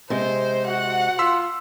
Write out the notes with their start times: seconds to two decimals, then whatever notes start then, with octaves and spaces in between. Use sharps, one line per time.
0.10 C3 G#3 C5
0.67 F#4 F#5
1.19 F4 C6 E6 B6